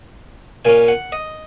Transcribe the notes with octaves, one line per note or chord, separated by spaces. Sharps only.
A#2 A#3 C#4 G#5
F#5
D#5